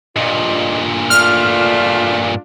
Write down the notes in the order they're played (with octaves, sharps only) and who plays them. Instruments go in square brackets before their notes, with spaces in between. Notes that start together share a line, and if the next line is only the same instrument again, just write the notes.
[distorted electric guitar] G2 A#2 [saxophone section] F4 D5 D#5
[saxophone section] A3 D4 F4 [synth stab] F6